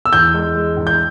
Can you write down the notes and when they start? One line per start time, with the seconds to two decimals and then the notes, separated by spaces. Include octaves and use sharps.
0.06 E6
0.13 E2 G6
0.34 G#3
0.55 G#3
0.77 E2
0.87 G6